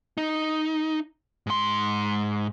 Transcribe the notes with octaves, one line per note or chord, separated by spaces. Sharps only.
D#4
G#2 C6